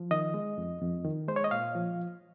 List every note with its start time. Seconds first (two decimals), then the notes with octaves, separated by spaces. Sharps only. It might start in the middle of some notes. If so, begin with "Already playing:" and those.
Already playing: F3
0.11 D#3 D#5
0.34 G#3
0.58 F2
0.81 F2
1.05 D#3
1.28 G#3 C5
1.36 C#5
1.44 D#5
1.51 A#2 F5
1.75 F3